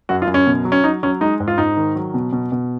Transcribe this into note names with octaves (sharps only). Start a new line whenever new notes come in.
F#2 F#4
F4
F#2
C#4
B2
F#3
C#4
F#3 D#4
F#3 C#4
G#3 D#4
G#2
F4
G#2 D#4
D#3
F#3
B2
B2
B2